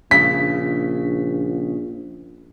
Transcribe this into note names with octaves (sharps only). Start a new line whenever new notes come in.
A#1 C#3 D4 B6